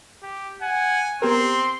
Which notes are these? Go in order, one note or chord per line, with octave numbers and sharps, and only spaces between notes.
G4
F#5 G#5
B3 C4 G4 A#4 C6